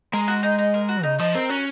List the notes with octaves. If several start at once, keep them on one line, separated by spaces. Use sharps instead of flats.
G#3 A#4
F#4
D#4
D#4
A#4
F#4
C#3 D#4
F3 D#4
C4 A#4
C#4 F#4